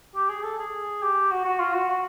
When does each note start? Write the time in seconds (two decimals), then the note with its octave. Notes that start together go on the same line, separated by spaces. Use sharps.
0.15 G4
0.29 G#4
0.44 A4
0.59 G#4
1.02 G4
1.31 F#4
1.45 F#4
1.59 F4
1.73 F#4
1.89 F#4